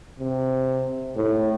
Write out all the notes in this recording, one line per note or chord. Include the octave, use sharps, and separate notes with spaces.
C3
A2